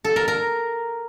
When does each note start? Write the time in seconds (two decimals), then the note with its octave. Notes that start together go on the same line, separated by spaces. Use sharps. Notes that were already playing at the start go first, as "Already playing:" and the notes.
0.04 A4
0.16 A#4
0.28 A#4